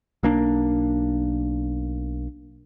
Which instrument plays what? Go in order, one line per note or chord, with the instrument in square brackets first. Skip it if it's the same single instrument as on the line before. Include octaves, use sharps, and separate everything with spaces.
[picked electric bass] B1 A#3 D4